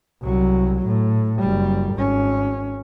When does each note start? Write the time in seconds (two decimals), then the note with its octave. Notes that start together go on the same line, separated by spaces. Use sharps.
0.22 C2 F#3
0.86 A2
1.39 F#1 G3
1.95 G#1 C#4